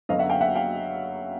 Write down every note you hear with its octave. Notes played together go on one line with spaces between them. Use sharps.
F#2 D3 F#3 B3 D#5 F5
E5 F#5
F5 G5
E5 F#5
F5 G5